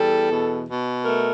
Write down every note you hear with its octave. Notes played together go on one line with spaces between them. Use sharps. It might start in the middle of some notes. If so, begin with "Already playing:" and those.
Already playing: E2 G3 A4
B2
B2
A3 A#4